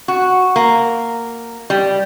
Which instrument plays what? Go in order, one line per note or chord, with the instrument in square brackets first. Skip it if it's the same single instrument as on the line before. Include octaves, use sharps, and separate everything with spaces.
[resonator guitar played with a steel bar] F#4
A#3
G3